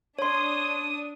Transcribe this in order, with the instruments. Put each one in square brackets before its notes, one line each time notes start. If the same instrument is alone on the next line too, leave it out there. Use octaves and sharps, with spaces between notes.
[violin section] D4 D#6 [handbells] C#5 C6